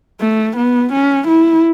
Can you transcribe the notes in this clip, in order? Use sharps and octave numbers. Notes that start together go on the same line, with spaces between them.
A3
B3
C#4
E4